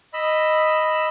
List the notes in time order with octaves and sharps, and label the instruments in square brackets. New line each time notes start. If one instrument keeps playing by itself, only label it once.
[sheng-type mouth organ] D#5 B5 E6